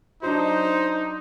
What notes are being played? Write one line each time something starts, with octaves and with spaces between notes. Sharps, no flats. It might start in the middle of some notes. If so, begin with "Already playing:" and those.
F#3 D4 D#4 C5